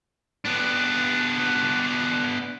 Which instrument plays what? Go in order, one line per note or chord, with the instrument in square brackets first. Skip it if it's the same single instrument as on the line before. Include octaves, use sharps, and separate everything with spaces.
[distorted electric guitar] B3 D4